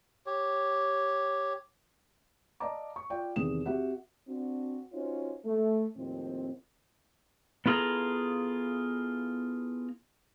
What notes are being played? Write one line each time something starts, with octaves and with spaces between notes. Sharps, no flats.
G4 C#5
D5 D#5 F5 A5 A#5 D6
C#6
F4 D5 F5 G5
E2 C3 D#3 D#6 E7
C4 F#4 G4 E5 F#5
C4 D4 F#4
C#4 D#4 F4 F#4 C5 C#5
A3
D#2 A2 F3 C4
B3 E4 F4 G#4 A4 A#5